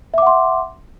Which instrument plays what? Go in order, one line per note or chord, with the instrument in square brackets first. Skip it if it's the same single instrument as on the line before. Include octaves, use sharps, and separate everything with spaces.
[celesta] E5
D6
F#5
C6